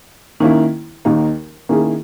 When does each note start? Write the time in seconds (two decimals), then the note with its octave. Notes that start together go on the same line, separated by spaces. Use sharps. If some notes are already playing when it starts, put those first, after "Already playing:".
0.40 D#3 A#3 C#4 E4
1.05 D#2 D#3 A#3 D#4
1.69 D#3 A#3 C#4 E4 G#4